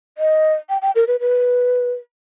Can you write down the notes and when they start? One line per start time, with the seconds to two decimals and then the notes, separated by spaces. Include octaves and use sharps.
0.18 D#5
0.69 G5
0.82 G5
0.95 A#4
1.07 B4
1.20 B4